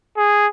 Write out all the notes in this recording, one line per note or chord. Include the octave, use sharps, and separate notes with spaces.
G#4